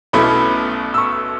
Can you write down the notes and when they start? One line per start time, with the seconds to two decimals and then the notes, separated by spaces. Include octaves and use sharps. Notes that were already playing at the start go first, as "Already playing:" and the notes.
0.13 B1 B2 A3 C#4 E4 B5
0.94 E6
0.98 C#6